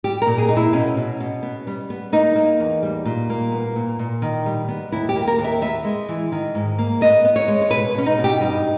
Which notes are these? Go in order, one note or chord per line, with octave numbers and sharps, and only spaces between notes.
G3 G4
A#2 A#4
G#4
A#2 D#4
E4
B2 C#4
B2
B2
B3
G3
B3
A#3 D#4
A#3
E2
G3
A#2
A#3
B3
A#2
A#2
D#3
G3
B3
D#2 E4
G4
A#3
A#4
D#2
E5
B3 E5
G#3
E3
D#3
G#2
A#3
B3 D#5
B3
C#5
G#3
C#5
B2 B4
B2 C#4
D#4
B2
G4
G2 D#4